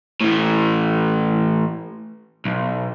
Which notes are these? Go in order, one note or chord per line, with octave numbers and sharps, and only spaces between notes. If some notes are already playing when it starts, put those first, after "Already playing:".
A2 E3
B1